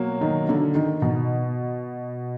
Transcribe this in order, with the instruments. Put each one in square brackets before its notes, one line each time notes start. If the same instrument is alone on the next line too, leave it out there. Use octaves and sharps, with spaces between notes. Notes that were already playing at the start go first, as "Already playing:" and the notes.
Already playing: [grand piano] B2 F#3 A#3
[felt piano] D#3
D3
D#3
B2